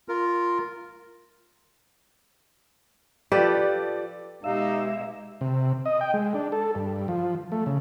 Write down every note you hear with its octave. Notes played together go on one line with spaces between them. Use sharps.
F4 A#4
F3 G4 A4 B4 D5
B2 G#3 D#4 G4 E5 F5
C3
D#5
G5
G#3
D4
A4
G2
F3
A3
C#3